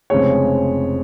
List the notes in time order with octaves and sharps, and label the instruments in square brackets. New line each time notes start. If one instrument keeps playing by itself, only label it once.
[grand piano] F1 F2 C#3 G#3 C#5